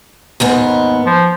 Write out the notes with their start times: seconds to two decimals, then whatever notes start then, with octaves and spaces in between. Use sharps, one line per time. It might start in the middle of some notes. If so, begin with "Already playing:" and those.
0.40 D#2 G#2 B3
1.06 F3